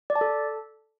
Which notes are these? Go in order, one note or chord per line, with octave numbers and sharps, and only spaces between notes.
D5
A5
A4